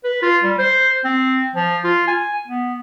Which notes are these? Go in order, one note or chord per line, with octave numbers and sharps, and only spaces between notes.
B4
F4
G3
C5
C4
F3
F4
G#5
B3